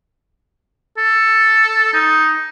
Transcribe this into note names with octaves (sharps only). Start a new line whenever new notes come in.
A4
D#4